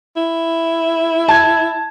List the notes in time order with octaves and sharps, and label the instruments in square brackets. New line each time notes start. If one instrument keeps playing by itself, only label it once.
[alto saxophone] E4
[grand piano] A5 G#6